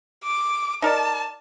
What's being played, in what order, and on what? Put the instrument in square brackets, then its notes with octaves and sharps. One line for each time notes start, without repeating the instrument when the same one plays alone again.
[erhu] D6
[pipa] D#4 A#4 D5 [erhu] A5